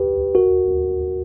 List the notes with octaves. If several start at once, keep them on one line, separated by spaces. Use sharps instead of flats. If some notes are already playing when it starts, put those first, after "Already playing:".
Already playing: G4 B4
F#4 A#4